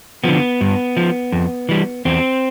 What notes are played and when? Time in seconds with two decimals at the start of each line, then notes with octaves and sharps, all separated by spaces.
0.24 D3 F3 B3
0.61 G2
0.97 F3
1.32 F2
1.69 E3 G3
2.05 E2 C4